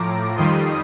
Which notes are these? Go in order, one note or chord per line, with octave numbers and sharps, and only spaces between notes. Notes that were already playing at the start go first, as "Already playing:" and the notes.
Already playing: A2 F3 A#5 D6
F2 D#3 G3 C6 D#6